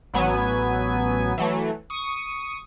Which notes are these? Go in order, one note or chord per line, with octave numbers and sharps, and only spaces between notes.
A1 F#3 B3 G#5 B6
E3 F#3 A3
C#6 D#6